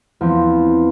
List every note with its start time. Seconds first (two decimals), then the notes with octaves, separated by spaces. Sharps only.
0.21 E2 F3 C4